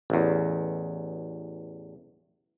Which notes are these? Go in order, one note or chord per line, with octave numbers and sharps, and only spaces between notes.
A1 E2